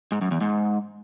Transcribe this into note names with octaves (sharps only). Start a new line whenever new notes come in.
G#2
F#2
E2
G#2